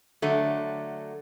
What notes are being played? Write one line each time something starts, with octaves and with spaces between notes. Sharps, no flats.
D3 F#3 A3